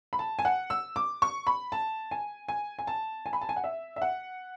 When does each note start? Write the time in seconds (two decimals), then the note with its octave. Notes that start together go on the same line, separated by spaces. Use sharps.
0.13 B5
0.19 A5
0.39 G#5
0.45 F#5
0.70 E6
0.96 D6
1.22 C#6
1.47 B5
1.72 A5
2.11 G#5
2.48 G#5
2.79 G#5
2.87 A5
3.26 G#5
3.33 B5
3.41 A5
3.49 G#5
3.56 F#5
3.64 E5
3.96 E5
4.02 F#5